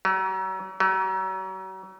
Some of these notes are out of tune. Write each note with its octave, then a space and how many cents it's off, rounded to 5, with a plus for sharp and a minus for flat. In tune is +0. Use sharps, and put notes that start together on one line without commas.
F#3 +40
F#3 +40